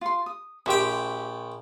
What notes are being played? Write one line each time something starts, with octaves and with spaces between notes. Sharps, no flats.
F4 C6
D#6
A#1 G4 C5 E5 G5